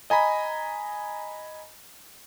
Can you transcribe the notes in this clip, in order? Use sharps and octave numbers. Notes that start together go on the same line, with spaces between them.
D#5 G#5 A#5 B5